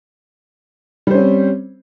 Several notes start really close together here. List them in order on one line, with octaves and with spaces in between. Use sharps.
G3 C5 C#4 C4